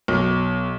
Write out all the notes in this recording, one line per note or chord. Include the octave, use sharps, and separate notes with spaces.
B1